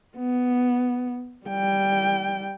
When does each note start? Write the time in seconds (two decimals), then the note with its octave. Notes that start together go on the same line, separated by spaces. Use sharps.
0.17 B3
1.46 G3 G5